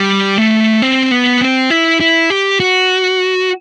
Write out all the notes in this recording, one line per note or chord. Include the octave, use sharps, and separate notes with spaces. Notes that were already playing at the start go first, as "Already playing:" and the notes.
Already playing: G3
A3
C4
B3
C4
E4
E4
G4
F#4